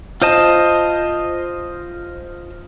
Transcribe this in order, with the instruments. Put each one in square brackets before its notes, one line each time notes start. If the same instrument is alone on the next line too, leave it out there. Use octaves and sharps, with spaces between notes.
[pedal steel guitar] F4 C5 D#5 A5